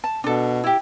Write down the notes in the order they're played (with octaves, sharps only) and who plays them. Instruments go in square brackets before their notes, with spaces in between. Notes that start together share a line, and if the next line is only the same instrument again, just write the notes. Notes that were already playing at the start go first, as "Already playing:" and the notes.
[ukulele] A5
[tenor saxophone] B2 [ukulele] D4 A4
[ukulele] E4 G4